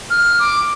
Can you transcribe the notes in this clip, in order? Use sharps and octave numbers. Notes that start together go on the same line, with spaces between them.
F6
D6